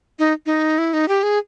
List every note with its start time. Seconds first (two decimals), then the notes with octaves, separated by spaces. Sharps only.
0.19 D#4
0.46 D#4
0.78 E4
0.93 D#4
1.08 G4
1.23 G#4